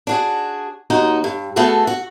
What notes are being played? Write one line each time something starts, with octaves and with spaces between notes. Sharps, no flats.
D4 F#4 G#4
D#2 D#4 F#4 D#5
G2
A3 B3 F#4 G#4 A4
F#4